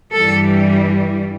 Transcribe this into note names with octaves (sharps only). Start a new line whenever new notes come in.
G2 E3 G3 A4